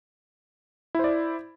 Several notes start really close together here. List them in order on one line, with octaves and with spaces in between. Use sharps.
E4 C5 D5